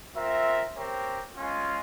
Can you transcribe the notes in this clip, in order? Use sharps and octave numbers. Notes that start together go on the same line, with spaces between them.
C4 F4 A#4 E5
C4 G4 A#4 C#5 G5
G#3 C#4 F4